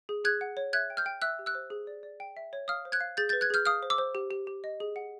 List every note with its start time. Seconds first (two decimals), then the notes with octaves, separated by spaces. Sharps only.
0.09 G#4
0.24 G#4 F#6 G#6
0.41 F#5
0.57 C#5
0.73 E5 F#6 G#6
0.90 G5
0.97 F6 G6
1.06 G5
1.22 E5 E6 F#6
1.39 G4
1.46 E6 F#6
1.55 C5
1.70 G#4
1.87 D5
2.03 D5
2.20 G5
2.37 E5
2.53 C#5
2.68 F5 D#6 F6
2.85 C5
2.92 F#6 G#6
3.01 F5
3.17 G#4 G6 A6
3.29 B4 G6 A6
3.41 F#6 G#6
3.50 G#4 F6 G6
3.66 F5 D#6 F6
3.83 C5
3.90 D6 E6
3.98 C5
4.15 G4
4.31 G4
4.47 G4
4.64 D#5
4.80 G#4
4.96 F#5